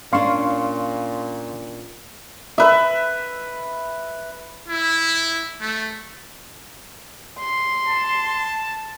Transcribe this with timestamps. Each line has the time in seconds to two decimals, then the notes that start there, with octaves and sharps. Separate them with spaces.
0.13 A#2 C#4 D4 F5 C6 C#6
2.58 B4 E5
4.68 E4
5.61 A3
7.39 C6
7.87 A5